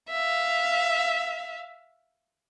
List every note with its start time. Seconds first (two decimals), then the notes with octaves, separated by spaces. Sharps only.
0.10 E5 F5